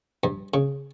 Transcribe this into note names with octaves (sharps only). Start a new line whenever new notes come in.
G2
C#3